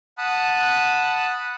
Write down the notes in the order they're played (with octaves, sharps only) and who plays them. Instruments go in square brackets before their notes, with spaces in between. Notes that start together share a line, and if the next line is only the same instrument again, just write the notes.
[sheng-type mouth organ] F#5 A5 B5 D#6 F#6